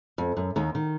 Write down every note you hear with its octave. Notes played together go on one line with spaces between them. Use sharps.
F2
F#2
D#2 D#3
D#3